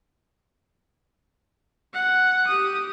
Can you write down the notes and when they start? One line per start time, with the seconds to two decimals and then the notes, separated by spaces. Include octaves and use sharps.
1.94 F#5
2.47 G4 D#6